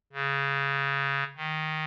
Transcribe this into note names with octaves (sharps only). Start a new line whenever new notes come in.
C#3
D#3